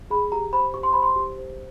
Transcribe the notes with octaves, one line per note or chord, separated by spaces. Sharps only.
G#4 B5
G4 A#5
C5 B5
G4 C#6
C6
C5 B5
C6
G4
C5